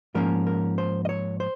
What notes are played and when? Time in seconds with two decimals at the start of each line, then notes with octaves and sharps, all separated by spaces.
0.15 G#2 F3 A#3 C#4 A#4
0.47 A#4
0.78 C5
1.05 D#5
1.09 C#5
1.40 C5